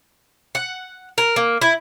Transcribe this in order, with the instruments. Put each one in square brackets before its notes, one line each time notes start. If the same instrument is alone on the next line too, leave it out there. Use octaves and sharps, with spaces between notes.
[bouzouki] F#5
A#4
A#3
E4